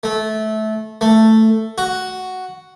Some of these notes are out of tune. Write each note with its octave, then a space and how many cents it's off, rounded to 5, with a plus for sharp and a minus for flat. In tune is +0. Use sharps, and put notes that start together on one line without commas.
A3 -20
A3 +5
F#4 +5